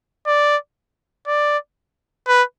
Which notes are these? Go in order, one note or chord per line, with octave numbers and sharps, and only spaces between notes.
D5
D5
B4